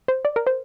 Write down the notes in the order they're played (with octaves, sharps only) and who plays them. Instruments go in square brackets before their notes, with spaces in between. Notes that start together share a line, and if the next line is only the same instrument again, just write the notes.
[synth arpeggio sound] C5
D5
A#4
C5